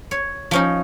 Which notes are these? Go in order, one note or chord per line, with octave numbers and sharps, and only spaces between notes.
C#5
F3 C#4 D#4